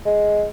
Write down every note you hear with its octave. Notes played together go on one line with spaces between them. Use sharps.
G#3